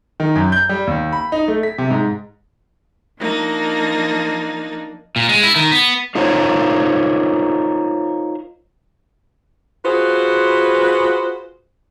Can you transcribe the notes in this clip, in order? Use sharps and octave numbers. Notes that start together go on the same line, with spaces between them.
D#3
F#2
G6
G3
D#2
B5
D#4
A3
B6
C3
G#2
F3 A#3 D4 D#4
A#2
G#3
E4
D#3
B3
D#4 F4 A#4 C5 C#5
F4 F#4 G#4 B4 C5